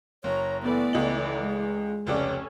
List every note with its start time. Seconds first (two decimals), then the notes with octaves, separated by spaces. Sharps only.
0.24 F#1 C#5 A#5
0.63 E3 A3 B3 D5
0.93 C#2 D#5 F#7
1.40 G#3
2.07 F1 C#2 C#4 A4 D5